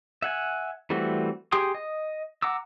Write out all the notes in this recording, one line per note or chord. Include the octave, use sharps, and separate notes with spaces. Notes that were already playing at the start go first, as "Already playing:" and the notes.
E5 F#5 G#5
E3 G3 A3 C4 F#4
G4 G#4 G5 C6 D#6
D#5
F#5 A#5 D6 E6